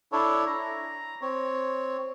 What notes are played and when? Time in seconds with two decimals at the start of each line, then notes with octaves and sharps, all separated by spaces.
0.12 D4 E4 A4 C#5
0.47 A#5
1.22 C4 C#5